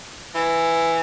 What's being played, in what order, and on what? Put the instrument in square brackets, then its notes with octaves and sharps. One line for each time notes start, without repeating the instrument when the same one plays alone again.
[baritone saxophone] E3